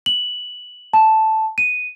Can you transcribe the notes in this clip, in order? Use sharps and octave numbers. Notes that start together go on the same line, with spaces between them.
F#7
A5
D#7